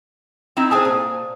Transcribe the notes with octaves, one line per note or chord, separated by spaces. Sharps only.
C4 D#4 E4
G#4 C5 G#5 A5 D#6
A#2